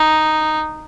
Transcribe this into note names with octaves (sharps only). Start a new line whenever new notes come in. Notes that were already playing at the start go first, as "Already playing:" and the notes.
Already playing: D#4